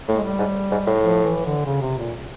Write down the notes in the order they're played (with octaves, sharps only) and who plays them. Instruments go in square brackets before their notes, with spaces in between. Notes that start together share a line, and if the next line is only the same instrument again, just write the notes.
[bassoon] A2 [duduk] A3
[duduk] G#3
G3
[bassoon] G#2
G#2
A2
[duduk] F3
E3
D3
C#3
C3
A#2